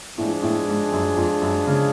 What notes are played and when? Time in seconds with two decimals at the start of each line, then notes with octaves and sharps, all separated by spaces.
0.18 A2 F3 G#3 D4 G#4
0.43 A2
0.68 G#2
0.92 F#2
1.17 F2
1.42 F#2
1.67 C#3